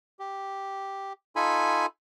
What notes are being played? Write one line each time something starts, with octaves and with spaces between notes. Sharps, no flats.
G4
D#4 F4 A4 G#5 B5